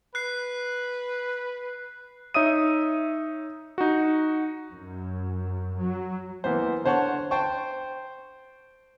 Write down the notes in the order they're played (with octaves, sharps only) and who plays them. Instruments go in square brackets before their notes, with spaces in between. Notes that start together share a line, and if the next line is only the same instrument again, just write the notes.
[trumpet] B4 [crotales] F#6 C7
[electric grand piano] D#4 C#5 E5 D#6 D#7
D#4 F#4
[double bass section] F#2
F#3
[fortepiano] E3 A#3 B3 C5
D3 C5 C#5 F#5 A5 C#6
C5 G5 A5 C#6